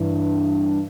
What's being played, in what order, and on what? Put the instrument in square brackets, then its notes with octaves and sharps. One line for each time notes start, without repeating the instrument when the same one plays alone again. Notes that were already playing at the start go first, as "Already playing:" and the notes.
Already playing: [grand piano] G2 E3